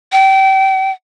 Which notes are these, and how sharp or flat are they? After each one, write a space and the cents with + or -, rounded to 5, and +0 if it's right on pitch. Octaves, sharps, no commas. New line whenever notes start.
G5 -30